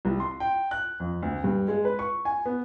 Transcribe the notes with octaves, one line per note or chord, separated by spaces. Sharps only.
C2
C6
G5
F#6
F2
D2
G2
G#3
B4
C#6
G#5
B3